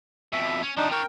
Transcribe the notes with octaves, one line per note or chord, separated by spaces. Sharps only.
F2 B2 E5
C#4
C3 F3 D4 D#4
D4 A#4 C#5 G5